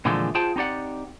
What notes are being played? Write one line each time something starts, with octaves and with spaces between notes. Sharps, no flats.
A#2 D3 E3 F3 G#3 A3
F4 G#4 C5 G5 A5
C4 D#4 G4 D5 F#5